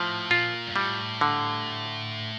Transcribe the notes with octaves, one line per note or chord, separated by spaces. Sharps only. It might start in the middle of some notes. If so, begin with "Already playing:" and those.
Already playing: A2 F3
A#2 F4
G2
A2 G3
D3